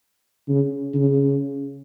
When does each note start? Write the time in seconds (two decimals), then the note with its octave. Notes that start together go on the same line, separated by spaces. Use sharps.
0.49 C#3
0.95 C#3